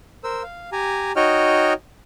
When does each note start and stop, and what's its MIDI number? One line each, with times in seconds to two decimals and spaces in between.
0.24 0.43 70
0.24 0.43 72
0.24 0.43 88
0.43 0.70 77
0.72 1.12 67
0.72 1.12 80
0.72 1.12 82
1.16 1.73 63
1.16 1.73 66
1.16 1.73 73
1.16 1.73 75
1.16 1.73 79
1.16 1.73 89